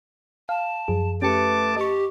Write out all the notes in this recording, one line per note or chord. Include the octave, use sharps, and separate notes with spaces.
F5 A5
F#2 F3 G#4
A3 C#4 G4 B4 A5 D6 C#7
G4 D#5 C#6